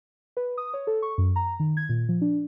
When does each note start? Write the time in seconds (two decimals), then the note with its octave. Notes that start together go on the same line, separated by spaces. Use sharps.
0.37 B4
0.58 D#6
0.74 C#5
0.87 A4
1.02 C#6
1.18 F#2
1.36 A#5
1.60 D#3
1.77 G#6
1.89 A#2
2.09 F3
2.22 D4